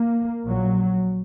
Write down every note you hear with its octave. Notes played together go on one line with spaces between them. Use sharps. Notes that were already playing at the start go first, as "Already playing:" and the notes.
Already playing: A#3
A#1 A#2 F#3